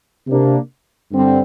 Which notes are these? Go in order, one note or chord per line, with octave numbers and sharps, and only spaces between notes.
C3 A#3 D4
G2 D3 G3 C4